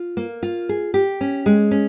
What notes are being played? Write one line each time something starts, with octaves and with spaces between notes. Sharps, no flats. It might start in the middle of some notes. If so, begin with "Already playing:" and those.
Already playing: F4
A#3
F4
G#4
G4
C#4
G#3
C#4